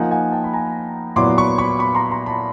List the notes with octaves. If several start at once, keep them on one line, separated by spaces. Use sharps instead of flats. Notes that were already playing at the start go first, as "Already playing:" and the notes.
Already playing: F3 A#3 D#4 F#5 G#5
F#5 G#5
G5 A5
B5
G#5 A#5
A#2 F#3 B3 E4 C6 D6
B5 C#6
B5 C#6
B5 C#6
A#5 C6
A#5 C6
A5 B5